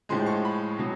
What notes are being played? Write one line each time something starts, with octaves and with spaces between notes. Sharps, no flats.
A2 F3 G#3 C6
C#6
B5
B2 F#3